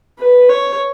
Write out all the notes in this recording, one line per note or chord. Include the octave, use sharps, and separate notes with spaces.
B4
C#5